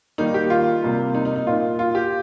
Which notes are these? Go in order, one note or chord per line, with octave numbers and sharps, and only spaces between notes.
D#3 G3 A#3 D#4
G4
F4
C3 G3 A#3
D#4
D#4
D#4
A#2 A#3 F4
F4
G4